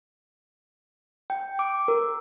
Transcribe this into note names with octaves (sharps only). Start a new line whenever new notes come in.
G5
D6
A#4